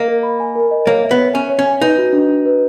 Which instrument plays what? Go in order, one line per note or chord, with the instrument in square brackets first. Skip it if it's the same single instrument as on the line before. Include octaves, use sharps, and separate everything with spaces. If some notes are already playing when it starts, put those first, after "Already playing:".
Already playing: [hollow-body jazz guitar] A#3 [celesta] D#5
[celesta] A#4
B5
G#5
A#4
D#5
[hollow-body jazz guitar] A#3 [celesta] C#5
[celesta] E5
[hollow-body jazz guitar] B3
[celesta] C#5
[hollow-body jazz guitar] C#4 [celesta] G#5
[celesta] C#5
[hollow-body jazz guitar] C#4
[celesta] G#5
[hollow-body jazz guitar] D#4 [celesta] B4
[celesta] F#4
D4
D4
B4